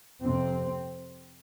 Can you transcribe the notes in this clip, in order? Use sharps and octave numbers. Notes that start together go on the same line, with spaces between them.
F2 C3 C4